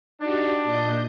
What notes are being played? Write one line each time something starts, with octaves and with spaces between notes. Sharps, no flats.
D4 D#4 F#4 G4
A#2 D#5 G6